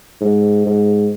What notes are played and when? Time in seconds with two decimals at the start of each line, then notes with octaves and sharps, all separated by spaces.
0.21 G#2
0.66 G#2